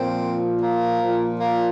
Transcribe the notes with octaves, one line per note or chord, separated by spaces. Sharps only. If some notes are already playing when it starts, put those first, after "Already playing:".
Already playing: A#2 F3 C4
A#3
A#2 F3
A#3